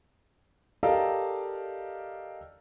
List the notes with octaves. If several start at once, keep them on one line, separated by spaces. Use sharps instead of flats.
G4 A4 A#4 D5 D#5 F5